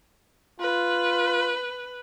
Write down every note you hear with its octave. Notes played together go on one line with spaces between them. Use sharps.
F4 B4